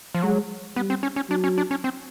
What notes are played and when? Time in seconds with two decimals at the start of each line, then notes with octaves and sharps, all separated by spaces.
0.14 F3
0.22 F#3 G#3
0.76 G3 B3
0.90 C4
1.03 C#4
1.16 C#4
1.30 F#3 D4
1.44 C#4
1.58 D4
1.71 C#4
1.84 C4